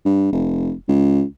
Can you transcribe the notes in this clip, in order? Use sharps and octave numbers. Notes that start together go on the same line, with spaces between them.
G2
F1
C#2